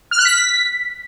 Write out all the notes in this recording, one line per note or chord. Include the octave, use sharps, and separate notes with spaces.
F6
F#6
B6